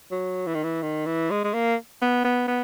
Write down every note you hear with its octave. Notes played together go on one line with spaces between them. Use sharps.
F#3
E3
D#3
E3
D#3
E3
G#3
G#3
A#3
B3
B3
B3